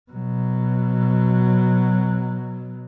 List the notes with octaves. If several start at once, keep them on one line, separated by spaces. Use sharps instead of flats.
B2 F#3